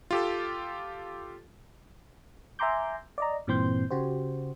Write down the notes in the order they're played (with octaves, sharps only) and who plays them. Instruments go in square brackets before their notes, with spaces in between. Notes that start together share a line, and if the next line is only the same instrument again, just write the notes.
[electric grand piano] F4 G4 A4
[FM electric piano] E5 G#5 A#5 C6 D6 G6
D5 D#5 A#5
G2 A#2 E3 C4 C6 G6
C#3 F#4 G4 C5